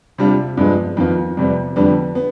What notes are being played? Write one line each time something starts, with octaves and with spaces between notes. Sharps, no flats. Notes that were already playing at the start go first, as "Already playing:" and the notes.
C3 G3 D4 F4
G2 F3 G#3 B3
F2 D#3 B3 F4
F2 C3 G3 B3
F2 D3 G3 B3
B3